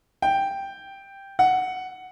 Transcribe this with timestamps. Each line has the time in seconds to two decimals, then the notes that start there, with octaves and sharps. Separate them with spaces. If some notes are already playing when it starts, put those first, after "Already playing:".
0.22 G5
1.39 F#5